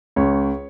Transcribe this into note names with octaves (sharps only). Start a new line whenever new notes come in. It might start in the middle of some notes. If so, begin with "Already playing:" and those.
C#2 C#5